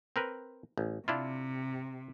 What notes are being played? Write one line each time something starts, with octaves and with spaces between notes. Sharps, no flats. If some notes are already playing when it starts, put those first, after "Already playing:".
C4 A#4 B4
A1
C3 D4 E4 F4